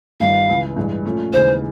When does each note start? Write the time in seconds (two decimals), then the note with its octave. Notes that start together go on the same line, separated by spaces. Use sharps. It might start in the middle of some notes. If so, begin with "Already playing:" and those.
0.20 G1 G2 D#3 G3 F5
0.49 C#2 C#3 E3
0.76 A1 G2 E3 G#3
1.05 A#2 F3 A3 C#4
1.33 D#2 C#3 E3 G#3 C5